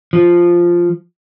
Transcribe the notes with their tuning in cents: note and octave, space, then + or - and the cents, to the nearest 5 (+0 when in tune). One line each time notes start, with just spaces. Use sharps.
F3 -5